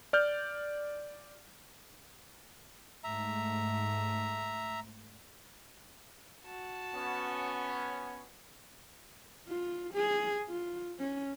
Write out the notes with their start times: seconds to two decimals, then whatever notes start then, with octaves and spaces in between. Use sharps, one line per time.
0.13 D5 F6 G6
3.04 G#2 A3 E5 A#5
6.44 F#4 A5
6.95 B3 C#4
9.49 F4
9.94 G#4
10.49 F4
10.99 C#4